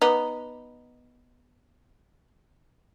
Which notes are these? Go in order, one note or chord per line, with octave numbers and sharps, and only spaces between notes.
B3 D#4